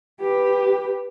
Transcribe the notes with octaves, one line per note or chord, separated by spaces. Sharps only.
G4 B4